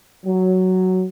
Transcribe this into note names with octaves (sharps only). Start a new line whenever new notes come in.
F#3